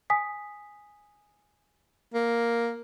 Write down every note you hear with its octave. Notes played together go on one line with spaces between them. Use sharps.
G#5 D#6 B6
A#3